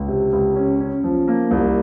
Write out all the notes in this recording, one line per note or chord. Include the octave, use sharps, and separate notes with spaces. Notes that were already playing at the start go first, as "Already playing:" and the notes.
Already playing: C#2
C3
C#2
C#4
C#4
F3
A#3
C2